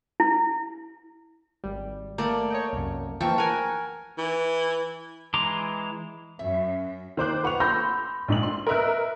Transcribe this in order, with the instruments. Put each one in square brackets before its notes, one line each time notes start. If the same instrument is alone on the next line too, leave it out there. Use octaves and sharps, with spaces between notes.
[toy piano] E4
[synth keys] G#1 G3
[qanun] A3 A#3 D5
[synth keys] C#5 D#5 G5
C2 F#2
[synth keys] E3 F3 A#3 [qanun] G5 A5 C#6
[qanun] A#4 G#5 [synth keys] F#5 A#5
[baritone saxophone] E3
[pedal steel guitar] E3 G#3 A#5 C6 D6
[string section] F#2 [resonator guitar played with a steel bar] E5
[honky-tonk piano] D#3 C5 D6 F#6
B4 F#5 C#6 F7
B5 C6 E6 G6 A#6
A#1 G#2 D#5 F#7
C6
A#4 B4 D#5 E5 E6 F#6